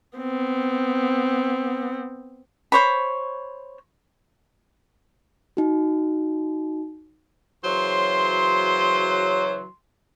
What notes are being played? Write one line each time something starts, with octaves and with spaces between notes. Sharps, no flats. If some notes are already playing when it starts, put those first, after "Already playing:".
B3 C4
C5 C#5 B5
D#4 F#4
C#3 E3 F#3 C5 C6